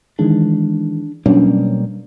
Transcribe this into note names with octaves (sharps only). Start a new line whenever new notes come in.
D#3 E3 G#3 D4
B2 F#3 G3 A#3 C#4 D4